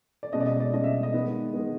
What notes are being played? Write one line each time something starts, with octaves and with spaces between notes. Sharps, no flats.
D5
B2 G#3 C#4 D#5
D5
D#5
D5
B2 G#3 C#4 D#5
E5
D#5
D#3 G#3 B3
D#3 G#3 B3